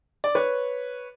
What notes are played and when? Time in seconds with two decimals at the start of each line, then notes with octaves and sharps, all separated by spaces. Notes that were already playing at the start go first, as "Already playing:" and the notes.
0.24 D5
0.35 B4 C#5